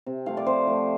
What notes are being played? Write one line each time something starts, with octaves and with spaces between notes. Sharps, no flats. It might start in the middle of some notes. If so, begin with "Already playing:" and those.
C3
F3 A3 F5
D5
C3 C5
F3 A3